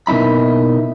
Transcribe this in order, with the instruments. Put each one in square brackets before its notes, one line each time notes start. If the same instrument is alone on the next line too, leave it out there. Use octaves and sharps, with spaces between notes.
[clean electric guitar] B2 A#3 D#4 E4 B5